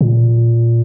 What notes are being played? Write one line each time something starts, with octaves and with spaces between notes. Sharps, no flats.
A#2